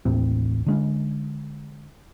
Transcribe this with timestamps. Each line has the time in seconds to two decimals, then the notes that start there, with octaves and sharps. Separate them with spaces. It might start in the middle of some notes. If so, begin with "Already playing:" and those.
0.05 A1 D#2 A2 C4
0.66 D3 G#3 C#4